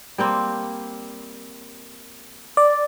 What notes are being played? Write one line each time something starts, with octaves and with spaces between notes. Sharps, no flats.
G3 A#3 C4
D5